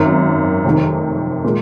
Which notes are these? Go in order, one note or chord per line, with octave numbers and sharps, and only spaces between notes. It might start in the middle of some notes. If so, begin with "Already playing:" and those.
Already playing: G#1 F#2 D#3
F1 F2 D#3
A#2 G#3